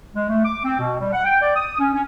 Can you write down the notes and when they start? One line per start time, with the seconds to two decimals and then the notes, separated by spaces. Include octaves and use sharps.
0.15 G#3
0.29 A3
0.43 D6
0.63 C4
0.78 B2
1.00 G3
1.13 F#5
1.24 G5
1.41 D5
1.55 D#6
1.79 C#4
1.94 C#4